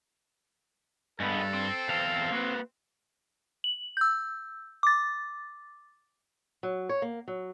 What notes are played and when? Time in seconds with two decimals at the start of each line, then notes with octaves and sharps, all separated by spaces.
1.20 G2 G#3 B3 A4
1.54 C4
1.89 E2 F5 A5
2.32 A#3 F#4 B4
3.64 F#7
3.97 E6 G6
4.83 D6 A6
6.63 F#3
6.89 C#5
7.02 A#3
7.28 F#3